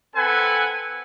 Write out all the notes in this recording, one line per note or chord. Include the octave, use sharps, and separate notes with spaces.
C4 A4 B4 F#5 G#5